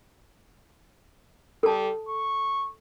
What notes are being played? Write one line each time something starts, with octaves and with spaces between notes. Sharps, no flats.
G3 A4 A5
C#6